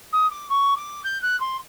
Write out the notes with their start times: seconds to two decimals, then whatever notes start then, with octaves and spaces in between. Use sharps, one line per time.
0.12 D#6
0.30 D6
0.49 C#6
0.76 D6
1.04 G6
1.22 F#6
1.40 C6